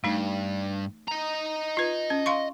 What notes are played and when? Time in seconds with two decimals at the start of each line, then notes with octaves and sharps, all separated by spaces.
0.04 G2 A3 D#4
1.08 D#5 A#5
1.77 F4 B4
2.10 C#4
2.26 F5 C6 C#6